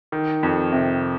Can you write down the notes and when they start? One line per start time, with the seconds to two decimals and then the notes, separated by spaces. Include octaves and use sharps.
0.12 D#3
0.43 F2
0.72 C3